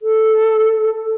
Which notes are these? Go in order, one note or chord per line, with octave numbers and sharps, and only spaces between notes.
A4